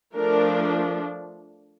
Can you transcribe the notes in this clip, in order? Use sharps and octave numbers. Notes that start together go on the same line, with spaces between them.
F3 A3 D4 A#4